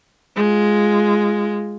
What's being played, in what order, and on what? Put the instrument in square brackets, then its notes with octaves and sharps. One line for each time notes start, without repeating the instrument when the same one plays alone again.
[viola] G#3 F4